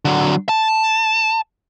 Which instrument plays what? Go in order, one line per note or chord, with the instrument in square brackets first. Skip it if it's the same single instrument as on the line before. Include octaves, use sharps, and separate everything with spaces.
[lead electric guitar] D3 F#3
A5